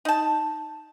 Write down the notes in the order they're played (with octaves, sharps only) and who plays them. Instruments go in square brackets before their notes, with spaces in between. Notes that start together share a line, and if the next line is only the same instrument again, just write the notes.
[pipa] D#4 A5